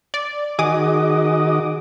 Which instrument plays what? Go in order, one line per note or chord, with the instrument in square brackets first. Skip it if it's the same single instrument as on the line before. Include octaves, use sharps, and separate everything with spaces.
[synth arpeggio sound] D5
[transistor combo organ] D#3 F#4 D#5 [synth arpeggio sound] G#4 D6 D#6